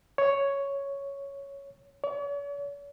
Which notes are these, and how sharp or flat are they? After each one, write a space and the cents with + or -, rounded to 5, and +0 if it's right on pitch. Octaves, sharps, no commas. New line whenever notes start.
C#5 +5
C#5 +45